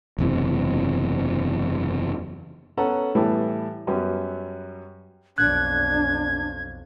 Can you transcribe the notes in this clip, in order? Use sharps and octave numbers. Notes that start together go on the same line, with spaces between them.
F#1 E2 C3
B3 C#4 A4 F#5 A#5
A2 E3 G3 A3 B3
F#2 F#3 G3 B3 C#4
B1 F2 D4 F#6 G#6